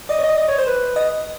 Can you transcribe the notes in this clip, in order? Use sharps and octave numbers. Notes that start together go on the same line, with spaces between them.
D5 D#5
C#5
D5 D#5
D#5
C#5
C5
B4
D#5